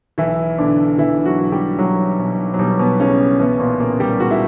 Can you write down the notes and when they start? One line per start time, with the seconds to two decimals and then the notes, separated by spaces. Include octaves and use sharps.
0.18 B1 E3 E4
0.58 B2 D3 D4
0.98 B2 E3 E4
1.25 F#3 F#4
1.39 B1
1.52 G3 G4
1.79 B1 F#3 F#4
2.19 B2
2.54 F#3
2.59 B2 G3
2.79 B2 B3
3.00 B1 C#3 C#4
3.40 B2 E3 B3
3.60 A#2 A#3
3.80 A#2 C#3 A#3
4.00 G3 G4
4.20 C#2 F#4
4.31 E4